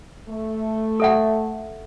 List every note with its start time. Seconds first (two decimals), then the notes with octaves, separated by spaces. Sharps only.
0.29 A3
1.00 A4 E5 F#5